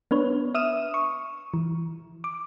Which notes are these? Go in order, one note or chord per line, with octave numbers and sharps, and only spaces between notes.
B3 D4 B4 C#5
E5 D#6 F6 D#7 E7
C#6
E3
D6